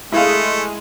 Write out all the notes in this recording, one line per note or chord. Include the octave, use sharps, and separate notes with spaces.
G#3 A3 E4 F5